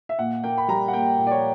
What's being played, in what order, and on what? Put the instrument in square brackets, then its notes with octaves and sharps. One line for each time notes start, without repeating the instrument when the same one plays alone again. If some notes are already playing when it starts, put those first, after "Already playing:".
[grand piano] E5
A#2 F#5
A#3 G5
B5
G3 A#5
F#5
A#3 G5
A#2
D5
C#5